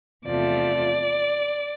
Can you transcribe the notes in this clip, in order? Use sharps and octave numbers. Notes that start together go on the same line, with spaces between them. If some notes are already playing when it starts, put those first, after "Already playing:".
E2 C3 F3 A3 D5